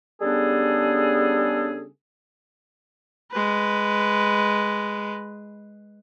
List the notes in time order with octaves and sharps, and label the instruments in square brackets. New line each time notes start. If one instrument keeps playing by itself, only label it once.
[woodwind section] C#3 G3 B3 D4 G#4 A4
[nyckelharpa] G#3 B4